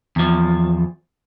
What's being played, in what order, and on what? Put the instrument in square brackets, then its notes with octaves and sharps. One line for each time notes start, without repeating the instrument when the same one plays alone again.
[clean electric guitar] E2 F3